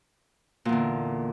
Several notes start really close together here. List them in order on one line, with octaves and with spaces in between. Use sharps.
A#2 E2 D3